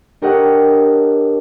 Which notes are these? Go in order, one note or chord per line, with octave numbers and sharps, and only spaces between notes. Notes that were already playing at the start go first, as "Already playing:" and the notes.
D4 G4 A#4 C#5 D#5 F#5